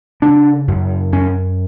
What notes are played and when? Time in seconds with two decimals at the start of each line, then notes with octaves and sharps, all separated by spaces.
0.22 C#3 D4
0.68 F#2
1.12 F#2 C#4